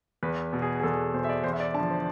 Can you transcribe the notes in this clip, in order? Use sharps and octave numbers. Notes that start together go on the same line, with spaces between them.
E2 B4
B2
G#4
G#4
E2 A4
B2 C5
E5
D5
E2 C5
E5
D5
D3 F3 A5
C5